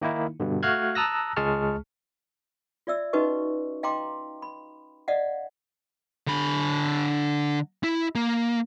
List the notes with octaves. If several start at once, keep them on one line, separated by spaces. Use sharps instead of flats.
D#3 A#3 D#4 E4
G2 B2 D3
A3 F#4 F5 F6 F#6 G#6
A5 A#5 D#6 E6 F#6 A#6
C#2 G#3 G#4 A5 C#6 F6
F4 D5 E5 E6
C#4 D#4 F#4 B4 D#5 C#6
D#5 F5 G5 A#5 C6 D6
B5
D5 D#5 F5 F#5
D3 B5
E4
A#3